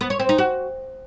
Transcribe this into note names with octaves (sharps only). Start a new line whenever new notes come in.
B3
C#5
C4
D#4
F#4